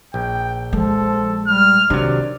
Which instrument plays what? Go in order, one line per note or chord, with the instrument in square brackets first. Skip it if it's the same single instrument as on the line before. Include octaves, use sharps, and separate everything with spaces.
[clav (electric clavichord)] A#1 [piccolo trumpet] G5
[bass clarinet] F3 [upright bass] G#3 [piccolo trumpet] A4
[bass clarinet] G3 [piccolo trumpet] F6
[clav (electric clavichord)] C3 F#3 [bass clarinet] D#3 [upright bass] D4 [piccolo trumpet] D5